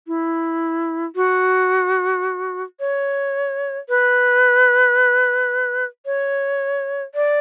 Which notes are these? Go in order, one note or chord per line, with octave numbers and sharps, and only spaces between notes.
E4
F#4
C#5
B4
C#5
D5